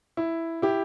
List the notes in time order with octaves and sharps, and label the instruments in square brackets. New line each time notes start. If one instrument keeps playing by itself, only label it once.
[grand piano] E4
E4 G4